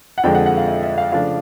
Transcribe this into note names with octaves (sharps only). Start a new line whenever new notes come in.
F#5
F2 D3 F3 G#3 G5
F#5
F#5
F5
E5
E5
F5
C#3 F3 A3 D4 F5